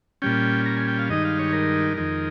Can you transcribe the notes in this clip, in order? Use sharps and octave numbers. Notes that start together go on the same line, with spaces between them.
A#2 G3 C#4 G5
A#5
G#5
G5
F5
G2 D#3 G#3 D#4 D#5
F5
C#5
A#4
F2 D#3 G#3 D#4